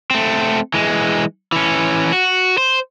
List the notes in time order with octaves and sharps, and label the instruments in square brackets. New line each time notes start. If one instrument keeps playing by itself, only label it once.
[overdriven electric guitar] A3 C4
E3 G#3
E3 C#4
F#4
C5